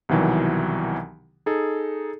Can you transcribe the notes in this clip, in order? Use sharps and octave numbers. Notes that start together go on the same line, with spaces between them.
C2 B2 D#3 E3 F#3
D#4 G#4 A4